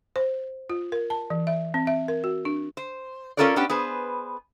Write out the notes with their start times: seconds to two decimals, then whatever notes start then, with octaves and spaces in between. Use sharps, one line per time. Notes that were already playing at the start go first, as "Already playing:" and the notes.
0.16 C5
0.70 F4
0.92 A#4
1.10 A5
1.30 E3
1.47 E5
1.74 C4
1.87 E5
2.08 A#4
2.24 F#4
2.45 D4
2.77 C5
3.37 C#4 F4 A4 A#4 C#5 D5
3.56 B3 C#4 D4 G4
3.70 B3 G#4 B4 C5